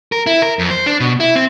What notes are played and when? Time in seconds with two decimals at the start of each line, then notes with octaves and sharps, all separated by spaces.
0.12 A#4
0.27 E4
0.42 A#4
0.59 F2
0.71 C5
0.86 D4
1.00 B2
1.20 E4
1.36 C4